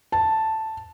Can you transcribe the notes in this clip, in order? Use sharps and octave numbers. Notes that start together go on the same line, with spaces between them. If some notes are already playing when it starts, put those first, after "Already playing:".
A5